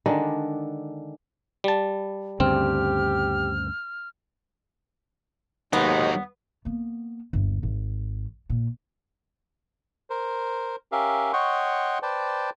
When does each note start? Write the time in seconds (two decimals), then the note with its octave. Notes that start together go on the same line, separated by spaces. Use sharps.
0.06 D3 D#3 G#3 D4
1.64 G3 A5
2.40 D2 G2 C#3 C4 G4 F6
5.73 D#2 G#2 F#3 G#3 B3 D#4
6.65 A#3 B3
7.33 G1 D#2
7.63 G#1
8.50 A#2
10.10 A#4 C5
10.92 C#4 G4 A#4 E5 F5
11.33 C#5 D#5 F#5 G5 C6 C#6
12.03 B4 C5 D5 G5 A5